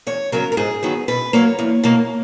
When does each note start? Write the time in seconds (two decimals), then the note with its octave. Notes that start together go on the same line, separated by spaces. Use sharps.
0.07 E2 C#5
0.32 C#3 F#3 B3 A#4
0.52 A#4
0.57 G#2 G#4
0.83 D#3 F#3 B3
1.08 B2 B4
1.33 F#3 A#3 C#5
1.59 E2
1.84 B2 A#3